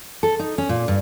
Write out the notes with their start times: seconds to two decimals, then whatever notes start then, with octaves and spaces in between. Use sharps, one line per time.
0.23 A4
0.39 D#4
0.58 C#4
0.69 A#2
0.88 G2